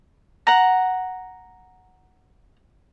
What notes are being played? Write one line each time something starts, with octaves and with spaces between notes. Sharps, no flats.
F#5 A#5